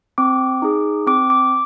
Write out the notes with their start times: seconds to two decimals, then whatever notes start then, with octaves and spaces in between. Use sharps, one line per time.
0.18 C4 D6
0.62 D#4 G#4
1.07 C4 D6
1.30 D6